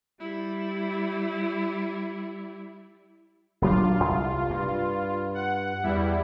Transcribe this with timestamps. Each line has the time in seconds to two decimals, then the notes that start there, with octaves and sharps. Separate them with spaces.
0.20 G3 E4
3.62 D#1 F#3 D4 F4
4.04 C2
4.50 G2
5.34 F#5
5.83 E2 G3 E4